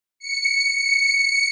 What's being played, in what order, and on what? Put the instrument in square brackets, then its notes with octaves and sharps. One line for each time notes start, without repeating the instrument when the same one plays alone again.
[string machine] C#7